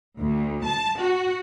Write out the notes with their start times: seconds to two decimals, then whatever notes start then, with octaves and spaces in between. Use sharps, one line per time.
0.19 D2
0.65 A5
0.99 F#4